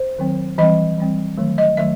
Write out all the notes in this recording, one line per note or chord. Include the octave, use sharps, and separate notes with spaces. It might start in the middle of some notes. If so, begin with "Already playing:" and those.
Already playing: C5
D#3 F#3 C4
E3 G3 C4 D#5
E3 G3 C4
D#3 F#3 A3
D#5
D#3 F#3 A3 E5